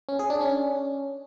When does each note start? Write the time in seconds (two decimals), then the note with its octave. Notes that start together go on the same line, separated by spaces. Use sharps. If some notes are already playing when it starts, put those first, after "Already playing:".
0.09 C#4
0.19 G#4
0.30 D4
0.41 C#4